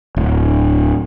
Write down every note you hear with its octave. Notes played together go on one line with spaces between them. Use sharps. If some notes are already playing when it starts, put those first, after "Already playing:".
D1